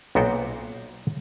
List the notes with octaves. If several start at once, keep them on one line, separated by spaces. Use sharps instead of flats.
B1 A#2 B3 F#4 C5 G5